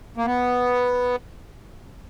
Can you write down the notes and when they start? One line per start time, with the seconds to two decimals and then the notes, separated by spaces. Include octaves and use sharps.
0.17 A#3
0.26 B3